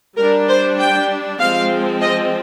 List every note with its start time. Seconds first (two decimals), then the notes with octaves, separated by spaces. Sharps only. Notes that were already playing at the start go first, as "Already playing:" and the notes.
0.17 G3 D4 A#4
0.48 C5
0.79 G5
1.40 F3 G#3 C4 F5
2.01 D#5